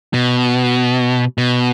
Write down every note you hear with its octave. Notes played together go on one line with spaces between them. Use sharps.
B2
B2